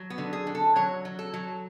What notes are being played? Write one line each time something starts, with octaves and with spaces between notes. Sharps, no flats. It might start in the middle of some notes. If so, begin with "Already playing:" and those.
Already playing: F#3
B3
D3
G#4
D3
A4
F#3 C#5
F#3
A4
F#3